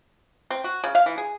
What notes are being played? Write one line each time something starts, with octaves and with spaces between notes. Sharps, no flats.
C4
F#4
C#3
F5
E3
G#4